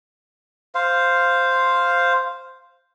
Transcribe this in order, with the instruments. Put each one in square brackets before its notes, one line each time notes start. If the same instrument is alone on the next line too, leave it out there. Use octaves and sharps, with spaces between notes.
[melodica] C5 F5